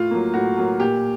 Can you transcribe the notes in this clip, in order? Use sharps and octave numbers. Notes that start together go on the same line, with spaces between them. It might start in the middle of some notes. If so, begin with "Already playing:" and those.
Already playing: A2 F4
F#3 A#3
A2 F#4
F#3 A#3
A#2 G4